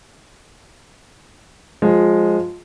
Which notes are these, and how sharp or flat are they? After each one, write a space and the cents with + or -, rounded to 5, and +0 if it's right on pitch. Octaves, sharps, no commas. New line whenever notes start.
F3 +15 G#3 +0